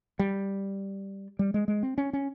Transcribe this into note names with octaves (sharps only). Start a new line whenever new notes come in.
G3
G3
G#3
G#3
C4
C#4
C#4